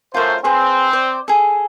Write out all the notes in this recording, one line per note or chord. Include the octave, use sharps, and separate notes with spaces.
F#2 A3 F4 A#4 C5
C4 G#4 B4 C5
C5 D5
G#4 A4